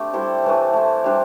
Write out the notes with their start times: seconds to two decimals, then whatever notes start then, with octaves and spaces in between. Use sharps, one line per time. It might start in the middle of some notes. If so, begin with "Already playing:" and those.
Already playing: A3 C4 D4 G4
0.13 G3 E4 A4 C5
0.44 A2 E3 A3
0.74 A3 E4 C5
1.04 G3 D4 C5